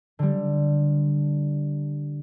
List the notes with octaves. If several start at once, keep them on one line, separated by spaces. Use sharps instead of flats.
D3 G3